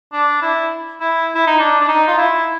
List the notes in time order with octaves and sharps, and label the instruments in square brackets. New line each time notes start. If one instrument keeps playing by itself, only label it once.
[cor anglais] D4
E4
E4
E4
D#4
D4
D4
D#4
F4
E4